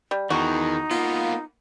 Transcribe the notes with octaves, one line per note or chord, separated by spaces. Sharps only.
G3
E2 D#3 D#4 F#4
A#3 B3 F4